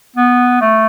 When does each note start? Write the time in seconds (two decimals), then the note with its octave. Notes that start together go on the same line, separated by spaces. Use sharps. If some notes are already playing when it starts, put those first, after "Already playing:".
0.16 B3
0.61 A3